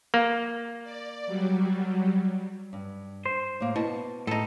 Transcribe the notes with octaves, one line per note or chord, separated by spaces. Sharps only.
A#3
D5
F#3 G3
G2
C5
A2 A#3
B2 E4 A5
A2 D#4 A4